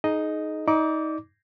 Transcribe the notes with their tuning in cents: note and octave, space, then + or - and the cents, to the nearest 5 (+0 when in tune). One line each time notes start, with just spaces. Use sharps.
D#4 +0 G#4 +30 D#5 +0
D#4 +25 D5 +20 D6 -15